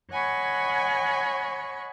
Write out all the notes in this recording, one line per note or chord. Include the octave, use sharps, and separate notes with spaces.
C#5 D#5 F#5 G#5 B5 C#6